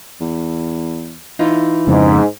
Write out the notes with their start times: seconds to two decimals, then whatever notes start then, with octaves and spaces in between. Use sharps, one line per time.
0.21 E2
1.39 E3 D#4 F4
1.87 F2 G#2 C#3